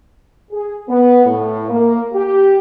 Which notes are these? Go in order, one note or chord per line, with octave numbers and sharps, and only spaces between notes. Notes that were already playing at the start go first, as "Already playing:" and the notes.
G#4
B3
A2
A#3
G4